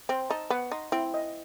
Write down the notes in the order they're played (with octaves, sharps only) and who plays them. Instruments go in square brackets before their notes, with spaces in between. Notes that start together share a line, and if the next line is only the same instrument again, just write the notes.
[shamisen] C4 [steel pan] C5
[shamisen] D#4 [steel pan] A5
[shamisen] B3 [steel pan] F#5
[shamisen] D#4 [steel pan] C6
[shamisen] C4 [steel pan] E4
[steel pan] D#5